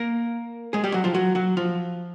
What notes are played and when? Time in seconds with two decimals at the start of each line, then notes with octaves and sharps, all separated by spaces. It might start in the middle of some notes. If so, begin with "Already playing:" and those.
Already playing: A#3 A#4
0.73 G#3 G#4
0.84 G3 G4
0.94 F#3 F#4
1.04 F3 F4
1.14 F#3 F#4
1.35 F#3 F#4
1.57 F3 F4